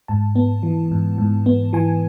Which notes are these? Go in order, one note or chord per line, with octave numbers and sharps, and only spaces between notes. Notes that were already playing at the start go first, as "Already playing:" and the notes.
G#2 A5
B3
E3
G#2
G#2
B3
E3 G#5